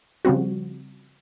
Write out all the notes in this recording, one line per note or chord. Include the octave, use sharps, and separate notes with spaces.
C#3 F3 G3 C4 F#4